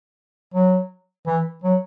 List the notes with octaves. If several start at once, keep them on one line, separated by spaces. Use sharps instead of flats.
F#3
E3
F#3